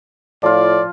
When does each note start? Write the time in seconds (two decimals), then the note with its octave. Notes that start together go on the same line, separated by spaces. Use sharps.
0.43 A2 F3 F4 D5